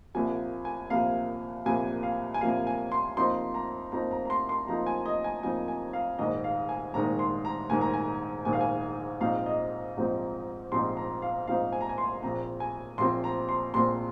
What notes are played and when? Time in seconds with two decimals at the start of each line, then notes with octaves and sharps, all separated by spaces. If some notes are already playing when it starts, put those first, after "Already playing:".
0.14 C2 A#2 F3 A#3 G#5
0.65 G#5
0.90 C2 A#2 F3 A#3 F5
1.66 C2 A#2 F3 A#3 G#5
2.03 F5
2.34 G#5
2.41 C2 A#2 F3 A#3 F5
2.67 G#5
2.92 C6
3.17 F2 F3 A#3 D#4 C6
3.54 A#5
3.92 F2 F3 A#3 D#4 A#5
4.11 A#5
4.25 A#5
4.30 C6
4.49 C6
4.68 F2 F3 A#3 D#4 A#5
4.86 G#5
5.06 D#5
5.24 G#5
5.43 F2 F3 A#3 D#4 G#5
5.68 G#5
5.93 F5
6.19 A#1 G#2 D#3 G#3 D#5
6.44 F5
6.69 G#5
6.94 A#1 G#2 D#3 G#3 A#5
7.19 C6
7.45 A#5
7.70 A#1 G#2 D#3 G#3 G#5
7.81 A#5
7.93 G#5
8.45 A#1 G#2 D#3 G#3 G#5
8.53 F5
8.61 G#5
9.21 A#1 G#2 F3 C4 D#4 F5
9.46 D#5
9.97 A#1 G#2 F3 C4 D#4
10.72 A#1 G#2 F3 C4 D#4 C6
10.97 A#5
11.22 F5
11.47 A#1 G#2 F3 C4 D#4 F5
11.73 G#5
11.81 A#5
11.89 G#5
11.98 C6
12.23 A#1 A#2 F3 C4 A#5
12.60 G#5
12.98 A#1 A#2 F3 C4 C6
13.24 A#5
13.49 C6
13.74 A#1 A#2 F3 C4 C6